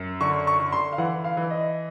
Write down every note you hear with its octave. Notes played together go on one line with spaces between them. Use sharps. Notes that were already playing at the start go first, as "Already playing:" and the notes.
Already playing: F#2
D3 C#6
C#6
D3
C6
F5
E3 F#5
F5
E3
D#5